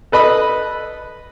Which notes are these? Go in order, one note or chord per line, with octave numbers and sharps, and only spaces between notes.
A4 B4 D#5 B5